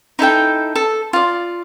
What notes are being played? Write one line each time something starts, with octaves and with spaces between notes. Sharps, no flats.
D#4 E4 A4 G5
A4
F4 D5